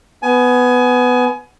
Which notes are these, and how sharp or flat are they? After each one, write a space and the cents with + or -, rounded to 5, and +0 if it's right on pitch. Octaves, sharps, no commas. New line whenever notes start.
B3 +10 G#5 +25